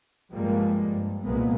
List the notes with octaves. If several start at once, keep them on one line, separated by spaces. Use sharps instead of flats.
G2 F3 G3 G#3 A#3
G2
C2 A#2 F3 G#3 A#3 B3